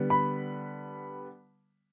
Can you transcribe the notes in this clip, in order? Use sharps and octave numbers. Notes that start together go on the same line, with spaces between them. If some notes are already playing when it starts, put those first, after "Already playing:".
Already playing: D3 G3 B3
B5